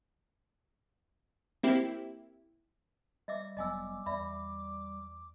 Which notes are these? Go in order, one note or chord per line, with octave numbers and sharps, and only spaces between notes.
A#3 C4 E4 G4
G3 D#5 E5 D6
F1 F#3 B3 D#5 G#5 D6 E6
E2 D5 E5 B5